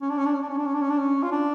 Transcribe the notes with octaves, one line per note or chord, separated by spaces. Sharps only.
C#4
D4
C#4
D4
C#4
D4
C#4
D4
C#4
D4
C#4
D4
C#4
F4
D4